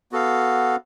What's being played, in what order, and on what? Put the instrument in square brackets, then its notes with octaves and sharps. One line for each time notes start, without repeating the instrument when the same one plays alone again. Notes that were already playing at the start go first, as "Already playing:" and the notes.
[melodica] B3 F#4 A4 F5